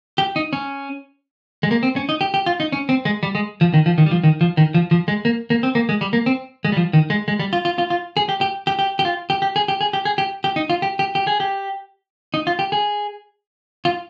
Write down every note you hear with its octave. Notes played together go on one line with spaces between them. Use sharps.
G4
D#4
C#4
G#3
A#3
C4
C#4
D#4
G4
G4
F4
D#4
C#4
C4
G#3
G3
G#3
F3
D#3
F3
D#3
G3
F3
D#3
F3
D#3
F3
F3
G#3
A#3
A#3
C4
A#3
G#3
G3
A#3
C4
G#3
G3
F3
D#3
G#3
G#3
G3
F4
F4
F4
F4
G#4
G4
G4
G4
G4
G4
F4
G4
G4
G#4
G4
G#4
G4
G#4
G4
G4
D#4
F4
G4
G4
G4
G#4
G4
D#4
F4
G4
G#4
F4